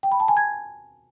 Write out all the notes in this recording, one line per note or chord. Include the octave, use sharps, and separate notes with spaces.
G5
B5
A5
G#5
G#6